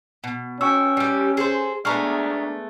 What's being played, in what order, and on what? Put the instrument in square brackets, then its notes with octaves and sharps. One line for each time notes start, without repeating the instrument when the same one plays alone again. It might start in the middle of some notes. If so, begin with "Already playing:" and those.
[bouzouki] B2
[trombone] C#4 [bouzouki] F#4 [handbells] G5 C#6 E6
[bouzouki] G3 G4
G#4 A4 C5
[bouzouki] G#3 A3 B3 [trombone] D4 [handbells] A#5 C#6 F6